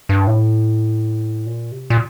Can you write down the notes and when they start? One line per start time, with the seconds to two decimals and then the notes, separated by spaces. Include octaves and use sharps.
0.09 G2
0.27 A2
1.46 A#2
1.72 C3
1.90 A#2